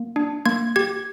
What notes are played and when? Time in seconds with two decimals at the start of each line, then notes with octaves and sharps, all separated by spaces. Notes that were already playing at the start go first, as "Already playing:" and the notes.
Already playing: A#3
0.16 D4
0.46 A#3 G#6
0.76 G4 G#6